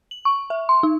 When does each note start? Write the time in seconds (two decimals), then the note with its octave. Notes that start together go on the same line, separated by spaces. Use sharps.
0.11 F#7
0.25 C#6
0.50 E5
0.69 C6
0.83 D#4